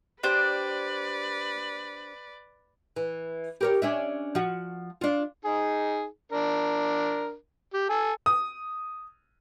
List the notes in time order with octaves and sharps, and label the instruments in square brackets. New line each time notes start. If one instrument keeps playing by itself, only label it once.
[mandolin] D4 G4 C5 [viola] B4 D5
[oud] E3
G4 A#4 C#5
C#4 D4 E5
F3 F#4
D4 F4
[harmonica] D#4 G#4
D4 A#4
G4
A4 G#5
[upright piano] D#6